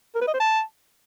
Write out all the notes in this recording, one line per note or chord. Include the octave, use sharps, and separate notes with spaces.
A#4
B4
D#5
C5
A5